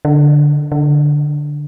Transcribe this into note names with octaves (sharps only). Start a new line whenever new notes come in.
D3
D3